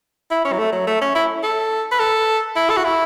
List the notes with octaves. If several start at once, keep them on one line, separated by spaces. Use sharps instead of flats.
E4
C#4
F#3
A3
F#3
A3
C#4
E4
A4
B4
A4
E4
A4
F#4
E4